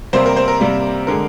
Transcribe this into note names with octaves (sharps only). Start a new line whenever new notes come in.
C3 G3 A#3 C4 C5
A#4
C4 C5
A#4
C3 G3 A#3
D3 G#3 A#4